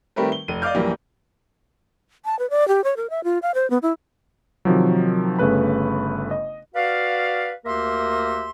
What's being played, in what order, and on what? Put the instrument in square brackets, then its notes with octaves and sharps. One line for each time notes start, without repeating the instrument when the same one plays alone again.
[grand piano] D#3 G3 A3 C4 A#4 B4
G7
F1 D#7
D5 D#5 F5 D6 F6 G6
A#1 F#2 E3 G3 A#3
[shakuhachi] A5
B4
D5
G4
C#5
A#4
E5
F4
F5
C5
B3
E4
[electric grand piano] C3 D#3 F3 F#3
G1 C#3 A3 B4 B5
D#5
[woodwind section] F#4 B4 D5 F5
D2 A#3 G4 A#4 E5 C6